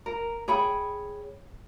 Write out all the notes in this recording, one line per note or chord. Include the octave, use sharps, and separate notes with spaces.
A#4
G#4 C#5 G5 B5